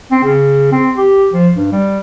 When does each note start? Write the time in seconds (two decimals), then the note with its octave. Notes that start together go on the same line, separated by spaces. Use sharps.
0.11 C4
0.24 C#3
0.72 C4
0.97 G4
1.32 F3
1.56 G2
1.72 G3